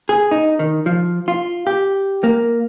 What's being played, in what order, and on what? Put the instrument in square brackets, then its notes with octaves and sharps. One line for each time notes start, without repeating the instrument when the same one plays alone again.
[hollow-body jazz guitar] G#4
D#4
D#3
F3
F4
G4
A#3